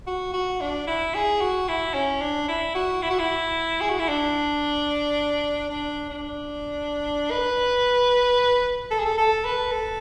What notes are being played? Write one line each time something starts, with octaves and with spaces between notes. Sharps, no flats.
F#4
F#4
D4
E4
G#4
F#4
E4
C#4
D4
E4
F#4
E4
F#4
E4
G#4
F#4
E4
D4
D4
D4
B4
A4
G#4
A4
A4
B4
A4